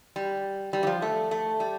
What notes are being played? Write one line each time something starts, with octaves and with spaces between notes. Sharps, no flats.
G3
G3
E3
F3
A3
A3
G3